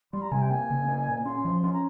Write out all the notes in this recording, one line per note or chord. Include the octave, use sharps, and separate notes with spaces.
G3 C6
A#5
C3 G#5
G5
A#3 G#5
C#3
A#3
A#2
C#4 C6
F3
C#4 C6
A#5